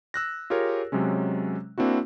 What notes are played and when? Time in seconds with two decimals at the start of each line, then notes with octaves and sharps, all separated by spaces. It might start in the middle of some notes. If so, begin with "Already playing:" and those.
0.14 E6 F#6 A#6
0.50 F4 G4 G#4 A#4 C#5
0.92 C3 F#3 G#3 C#4
1.78 A#3 C4 D4 E4 F#4